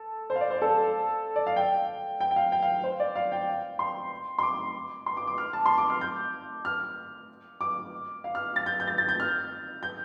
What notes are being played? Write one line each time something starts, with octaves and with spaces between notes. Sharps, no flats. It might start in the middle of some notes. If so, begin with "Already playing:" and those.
Already playing: A4
C5
F5
D5
C5
A4
D5
F5
G5
G5
G5
F5
G5
F5
C5
D5
F5
G5
C6
C6
D6
C6
D6
D6
F6
A5
C6
D6
F6
G6
F6
D6
F5
F6
A6
G6
G6
A6
A6
G6
F6
G6